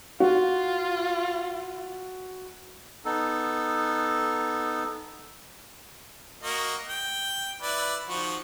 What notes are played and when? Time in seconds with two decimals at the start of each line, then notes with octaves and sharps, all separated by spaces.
0.20 F4 F#4
3.05 B3 D#4 A4
6.43 A#3 F#4 D#5
6.89 G5
7.62 E4 B4 D5
8.09 D#3 F3 F#4